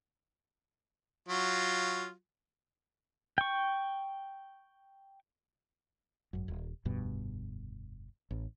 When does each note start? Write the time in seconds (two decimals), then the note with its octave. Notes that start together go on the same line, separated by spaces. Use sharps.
1.28 F#3 F4
3.38 G5 C#6
6.33 G#1 F#2
6.48 D#1
6.85 F1 D2 G2 B2
8.31 A1